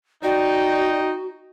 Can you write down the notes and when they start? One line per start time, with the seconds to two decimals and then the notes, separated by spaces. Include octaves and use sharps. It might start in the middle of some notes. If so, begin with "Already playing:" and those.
0.23 D#4 F#4 D5 G5